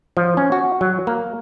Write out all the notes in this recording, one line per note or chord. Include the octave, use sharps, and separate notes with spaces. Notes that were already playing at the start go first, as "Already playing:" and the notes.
F3
C#4
F#4
F#3
A#3